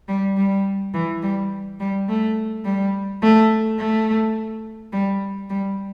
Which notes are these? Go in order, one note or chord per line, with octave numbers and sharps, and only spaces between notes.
G3
G3
E3
G3
G3
A3
G3
A3
A3
G3
G3